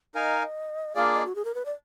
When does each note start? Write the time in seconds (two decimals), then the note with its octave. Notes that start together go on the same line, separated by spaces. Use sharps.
0.14 D#4 A#4 D#5 F5 G#5
0.95 A#3 D4 F4 G#4 D5 F5
1.15 D#5
1.25 F#4
1.35 G#4
1.45 A#4
1.55 B4
1.66 D5